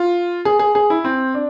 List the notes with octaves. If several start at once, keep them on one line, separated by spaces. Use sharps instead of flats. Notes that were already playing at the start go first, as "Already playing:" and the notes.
Already playing: F4
G#4
G#4
G#4
E4
C4
D4